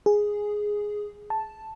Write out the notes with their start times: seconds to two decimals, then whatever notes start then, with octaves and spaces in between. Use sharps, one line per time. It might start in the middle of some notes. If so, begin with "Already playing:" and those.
0.06 G#4
1.30 A5